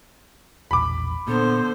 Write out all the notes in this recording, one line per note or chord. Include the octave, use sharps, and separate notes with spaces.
E1 A#1 B5 D6
A#2 D3 B3 C5